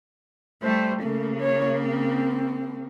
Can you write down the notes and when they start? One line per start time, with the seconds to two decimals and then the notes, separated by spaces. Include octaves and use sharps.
0.63 G3 A3 C5
1.03 C#3 A3 A#3
1.40 C#5
1.80 C4